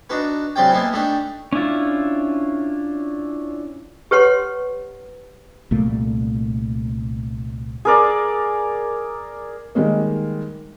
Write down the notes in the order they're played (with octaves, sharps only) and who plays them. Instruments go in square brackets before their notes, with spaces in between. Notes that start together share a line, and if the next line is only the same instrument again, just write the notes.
[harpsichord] D4 D#4 F#4 B4
C#3 F#3 C4 G4 D5 G5
A#3 B3 D#4 E4 G#5
A3 D4 D#4 G4
[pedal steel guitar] C#4 D4 E4 F4
[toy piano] G4 B4 C#5 F#5 C6
[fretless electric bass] C2 A#2 A3 A#3
[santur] G#4 A#4 D5
[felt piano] D#3 G3 G#3 A#3